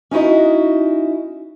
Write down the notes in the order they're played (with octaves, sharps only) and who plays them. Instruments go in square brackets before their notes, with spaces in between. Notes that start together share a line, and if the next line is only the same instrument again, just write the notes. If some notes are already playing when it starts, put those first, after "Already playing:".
[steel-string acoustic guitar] C#4 D#4 E4 F#4 D#5